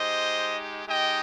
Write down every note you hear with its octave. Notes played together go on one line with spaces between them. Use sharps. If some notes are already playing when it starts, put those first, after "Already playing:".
Already playing: G#3 D#4 G4 C5 D#5
G#3 D#4 G4 D#5 G5